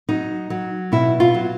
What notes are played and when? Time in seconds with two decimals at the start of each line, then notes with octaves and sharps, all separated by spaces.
0.09 F#3 D#4
0.50 F#3
0.92 B2 E4
1.20 F4
1.34 F#3